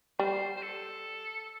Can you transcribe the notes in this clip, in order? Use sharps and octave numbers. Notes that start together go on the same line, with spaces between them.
G3 C5
C5
A4